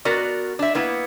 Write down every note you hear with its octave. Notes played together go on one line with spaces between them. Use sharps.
B3 F#4 A#4 D5
D4 E5
A#3 B3 E4